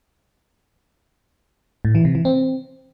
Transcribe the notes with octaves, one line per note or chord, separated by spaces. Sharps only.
A2
E3
C3
E3
C4